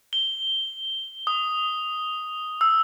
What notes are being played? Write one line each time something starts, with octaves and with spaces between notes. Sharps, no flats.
G7
D#6
E6